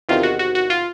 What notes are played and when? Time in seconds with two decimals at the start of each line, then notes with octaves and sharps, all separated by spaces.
0.09 E2 C3 D#3 F4
0.23 F#4
0.39 F#4
0.55 F#4
0.70 F4